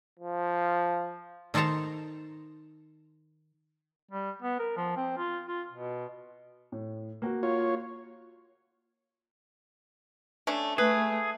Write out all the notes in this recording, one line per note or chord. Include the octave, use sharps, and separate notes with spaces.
F3
D#3 D#4 A4 C5 A5 A#5
G3
B3
A#4
F3
C4
F4
F4
B2
A2
A#3 F#4
F4 C#5
A3 C#4 D4
A3 G#4 B4